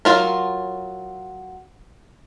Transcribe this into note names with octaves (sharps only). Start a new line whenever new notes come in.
F#3 F4 A#4